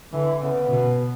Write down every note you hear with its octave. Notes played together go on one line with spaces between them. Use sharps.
D3 E3
C#3 B3
B2